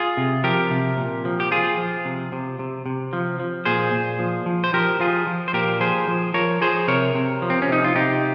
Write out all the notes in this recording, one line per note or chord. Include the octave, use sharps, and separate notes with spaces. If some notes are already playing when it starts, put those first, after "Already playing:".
Already playing: F4 G#4
C3
F3 G4 A#4
C3
A#2
F3
G4
F3 F4 G#4
F3
C3
C3
C3
C3
F3
F3
A#2 G#4 C5
A#2
F3
F3
C5
F3 G4 A#4
F3 F4 G#4
F3
C5
A#2 G4 A#4
F3 G#4 C5
F3
F3 A#4 C#5
F3 G#4 C5
C3 A#4 C#5
C3
F3
C4
C#4
C3 D#4
F4
C3 D#4 G4